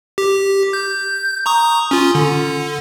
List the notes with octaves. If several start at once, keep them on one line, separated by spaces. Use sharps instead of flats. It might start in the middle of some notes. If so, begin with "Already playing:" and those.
G4
G6
A#5 C#6 D#6
C#4 F4
D3